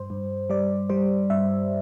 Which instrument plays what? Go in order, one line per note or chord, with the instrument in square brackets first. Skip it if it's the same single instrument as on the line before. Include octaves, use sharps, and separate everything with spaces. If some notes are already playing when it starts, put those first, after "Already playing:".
Already playing: [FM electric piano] G2 C5
G2
G3 D5
G3 C5
G2 E5